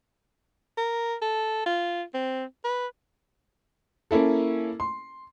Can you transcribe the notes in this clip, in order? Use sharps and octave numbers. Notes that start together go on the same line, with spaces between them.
A#4
A4
F4
C4
B4
A#3 C#4 E4 A4
C6